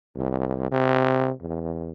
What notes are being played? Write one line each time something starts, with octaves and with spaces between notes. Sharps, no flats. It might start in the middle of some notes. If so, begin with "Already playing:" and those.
C2
C3
E2